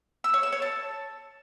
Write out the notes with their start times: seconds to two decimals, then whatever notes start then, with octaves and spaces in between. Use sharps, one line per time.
0.24 E6
0.34 C#5
0.43 E6
0.53 C#5
0.62 A5